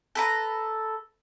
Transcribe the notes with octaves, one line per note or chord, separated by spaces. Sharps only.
A4 B4 A#5